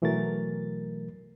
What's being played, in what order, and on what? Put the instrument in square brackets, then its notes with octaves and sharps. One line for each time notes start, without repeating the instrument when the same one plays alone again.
[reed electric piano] B2 E3 F#3 A3 A#4 A6